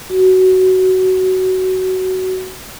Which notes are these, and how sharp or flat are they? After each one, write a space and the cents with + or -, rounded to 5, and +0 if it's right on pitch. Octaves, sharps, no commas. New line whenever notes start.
F#4 +15